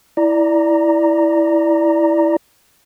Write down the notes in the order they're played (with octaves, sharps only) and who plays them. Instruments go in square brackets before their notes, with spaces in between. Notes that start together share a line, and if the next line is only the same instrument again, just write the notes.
[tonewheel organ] E4 D5 A#5